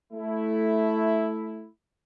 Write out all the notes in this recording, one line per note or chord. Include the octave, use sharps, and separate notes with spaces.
A3 E4